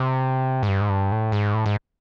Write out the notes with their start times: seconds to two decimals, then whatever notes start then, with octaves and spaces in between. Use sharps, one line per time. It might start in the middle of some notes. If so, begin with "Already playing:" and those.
Already playing: C3
0.63 G#2
0.68 G2
0.81 G#2
0.89 G2
1.12 A2
1.32 G#2
1.54 A2
1.66 G#2